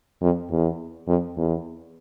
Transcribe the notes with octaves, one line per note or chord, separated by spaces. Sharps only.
F2
E2
F2
E2